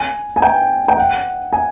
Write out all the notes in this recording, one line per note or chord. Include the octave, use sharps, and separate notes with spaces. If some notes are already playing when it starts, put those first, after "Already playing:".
Already playing: G#5
G#5
G5
G5
F#5
G#5